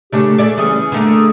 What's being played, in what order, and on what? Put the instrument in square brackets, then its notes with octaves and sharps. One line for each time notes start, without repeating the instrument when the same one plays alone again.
[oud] C#3 A3 D4 [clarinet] G4
[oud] A3 G#4 D5
[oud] E3 G3 C#4 [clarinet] G#4
[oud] D3 A3 A#3